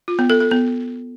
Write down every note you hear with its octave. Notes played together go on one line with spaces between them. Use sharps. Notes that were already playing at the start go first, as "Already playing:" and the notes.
F4
B3
A4
A4
B3